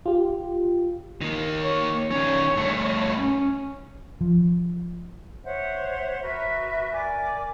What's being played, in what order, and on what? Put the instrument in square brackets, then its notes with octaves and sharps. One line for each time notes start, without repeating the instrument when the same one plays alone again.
[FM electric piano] F4 G4
[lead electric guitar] D#3 A#3
[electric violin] C#5
[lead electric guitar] D#3 C#4 [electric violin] C#5
[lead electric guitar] G2 A3
[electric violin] C#4
[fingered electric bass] F3
[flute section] C5 C#5 E5 F#5
F#4 A#4 B4 E5
A#4 D5 G#5 D6